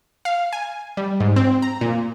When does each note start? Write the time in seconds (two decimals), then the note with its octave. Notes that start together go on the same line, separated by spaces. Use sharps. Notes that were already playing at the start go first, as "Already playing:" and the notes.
0.25 F5
0.53 G#5
0.97 G3
1.20 G#2
1.36 C4
1.62 A#5
1.81 A#2